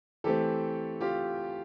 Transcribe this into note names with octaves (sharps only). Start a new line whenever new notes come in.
E3 A3 C4 G4 A4
F4 G4